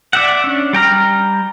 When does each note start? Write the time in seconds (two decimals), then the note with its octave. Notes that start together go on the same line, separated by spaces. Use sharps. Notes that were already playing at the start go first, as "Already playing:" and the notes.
0.13 D5 E5 F#5
0.44 C#4 D4
0.73 G3 G5 A#5 F6